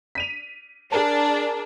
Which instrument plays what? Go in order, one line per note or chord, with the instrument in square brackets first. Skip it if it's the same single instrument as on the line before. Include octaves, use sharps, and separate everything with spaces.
[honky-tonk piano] B6 D#7 F7
[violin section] D4 [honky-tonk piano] G#4 A#4 A5